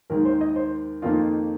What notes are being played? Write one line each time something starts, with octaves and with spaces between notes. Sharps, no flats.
D#2 D#3 G#3 A#4
C5
D#5
C5
F2 D#3 A#3 D#4 F4